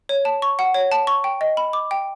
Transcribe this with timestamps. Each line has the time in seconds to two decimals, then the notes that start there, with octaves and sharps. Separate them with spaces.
0.09 C#5
0.25 A5
0.42 C#6
0.59 F#5
0.74 C#5
0.91 A5
1.07 C#6
1.24 G5
1.41 D#5
1.57 B5
1.73 D6
1.91 G5